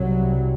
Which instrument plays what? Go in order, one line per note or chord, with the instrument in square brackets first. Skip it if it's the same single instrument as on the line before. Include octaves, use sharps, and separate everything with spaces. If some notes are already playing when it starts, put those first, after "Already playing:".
Already playing: [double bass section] C2 C3 F#3